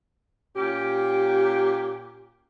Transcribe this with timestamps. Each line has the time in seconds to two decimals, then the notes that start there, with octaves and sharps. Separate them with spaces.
0.56 A#2 C#4 G4